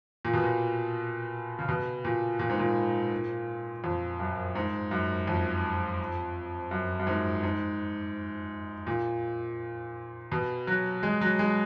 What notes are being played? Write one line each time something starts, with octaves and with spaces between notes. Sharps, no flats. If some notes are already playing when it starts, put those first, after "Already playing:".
A#2
B2
A#2
C#3
B2
A#2
A#2
G#2
A#2
F2
F#2
G#2
F#2
F2
F#2
F#2
G#2
G#2
A#2
B2
F#3
G#3
F#3
G#3